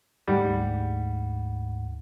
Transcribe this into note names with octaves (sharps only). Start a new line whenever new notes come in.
D2 G#2 G3 F#5